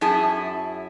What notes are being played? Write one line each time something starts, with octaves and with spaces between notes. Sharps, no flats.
F#2 E4 G#4 A5